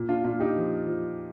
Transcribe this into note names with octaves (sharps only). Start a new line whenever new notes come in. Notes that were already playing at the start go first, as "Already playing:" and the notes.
Already playing: A#2
D4 F4
A#2 D4 F4
D#4 G4
F3
F3